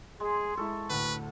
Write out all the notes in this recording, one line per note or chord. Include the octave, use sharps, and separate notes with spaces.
G#3 G#4
G#3 E4 A4 C#6
D2 A2 B4